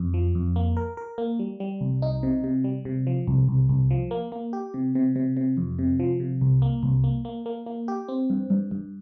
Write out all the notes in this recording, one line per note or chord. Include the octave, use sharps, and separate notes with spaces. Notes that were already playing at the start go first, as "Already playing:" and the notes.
Already playing: F2
F3
F2
A#3
A#4
A#4
A#3
G3
G3
C2
D#4
C3
C3
G3
C3
F3
C2
C2
C2
F3
A#3
A#3
G4
C3
C3
C3
C3
F2
C3
F3
C3
C2
A#3
C2
A#3
A#3
A#3
A#3
G4
C4
G2
G2
G2